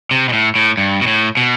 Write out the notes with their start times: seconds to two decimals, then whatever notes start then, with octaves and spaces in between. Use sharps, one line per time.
0.11 C3
0.29 B2
0.33 A2
0.56 A2
0.77 G2
1.01 B2
1.07 A2
1.37 B2